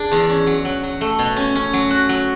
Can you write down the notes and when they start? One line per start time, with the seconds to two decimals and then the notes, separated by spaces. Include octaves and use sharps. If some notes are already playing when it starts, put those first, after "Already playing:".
Already playing: D4 G#4
0.12 E2
0.29 C#4
0.47 F#3
0.65 F#3
0.84 F#3
1.01 A3
1.19 B2
1.36 C#4
1.55 C#4
1.73 F#3
1.91 F#4
2.09 F#3